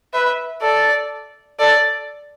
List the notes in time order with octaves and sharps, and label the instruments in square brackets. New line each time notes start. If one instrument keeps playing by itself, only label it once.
[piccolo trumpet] B4 [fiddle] E5
[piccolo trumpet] A4 [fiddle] D5
[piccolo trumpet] A4 [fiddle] D5